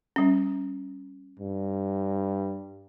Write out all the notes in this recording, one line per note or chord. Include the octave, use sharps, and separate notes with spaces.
G3 C#4
G2